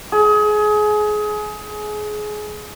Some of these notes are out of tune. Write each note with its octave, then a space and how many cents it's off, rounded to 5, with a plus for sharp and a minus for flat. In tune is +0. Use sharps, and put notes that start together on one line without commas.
G#4 +25